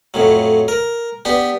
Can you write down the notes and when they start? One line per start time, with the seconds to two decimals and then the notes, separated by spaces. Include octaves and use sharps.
0.14 F2 A2 F#3
0.68 A#4
1.25 B3 D4 G4